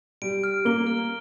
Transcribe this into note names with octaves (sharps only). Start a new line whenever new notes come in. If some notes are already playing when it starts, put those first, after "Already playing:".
G3 D7
F6
A#3 G7
F6